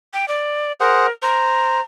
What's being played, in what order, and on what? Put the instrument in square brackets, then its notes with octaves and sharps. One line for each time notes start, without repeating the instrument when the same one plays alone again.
[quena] G5
D5
[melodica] G#4 C5 F#5 [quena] A#4
[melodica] C5 [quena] A#5